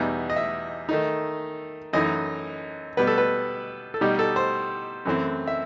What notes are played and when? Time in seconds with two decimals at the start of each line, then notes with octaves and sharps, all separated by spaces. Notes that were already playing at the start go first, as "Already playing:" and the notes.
Already playing: E2 B2 G3 B3 D#4 E5
0.30 D#5
0.36 E5
0.89 D#3 A3 D#4
1.93 F#2 E3 A3 D#4 D#5
2.97 B2 G3 B3 B4
3.07 A4
3.18 B4
3.94 A4
4.01 B2 G3 D#4 G4
4.19 A4
4.36 C5
5.05 F#2 E3 A3 C4
5.47 E5